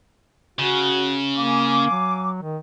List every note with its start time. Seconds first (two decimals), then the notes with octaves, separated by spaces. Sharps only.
0.59 C#3 F#4
1.37 A#3 F5 G#5 D6
1.91 F#3
2.42 D#3